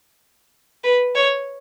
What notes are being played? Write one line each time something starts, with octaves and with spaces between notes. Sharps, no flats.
B4
C#5